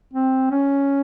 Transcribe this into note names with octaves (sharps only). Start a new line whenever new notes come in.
C4
C#4